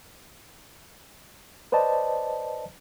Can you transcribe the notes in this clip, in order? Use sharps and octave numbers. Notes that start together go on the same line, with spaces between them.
B4 C5 D5 D#5 A5